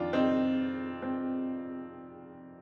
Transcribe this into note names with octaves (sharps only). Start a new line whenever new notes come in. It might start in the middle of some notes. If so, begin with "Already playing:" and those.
Already playing: F2 D#3 D4 F4
C4 D#4
C4